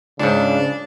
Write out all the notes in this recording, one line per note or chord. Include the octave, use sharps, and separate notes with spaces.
C#2 G#2 C#3 D4